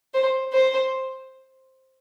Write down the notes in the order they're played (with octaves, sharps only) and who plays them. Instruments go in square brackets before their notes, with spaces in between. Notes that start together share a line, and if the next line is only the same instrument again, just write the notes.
[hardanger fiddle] C5
C5